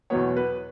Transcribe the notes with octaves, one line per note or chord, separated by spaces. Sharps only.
E2 B2 F#3 B3 C#5
B4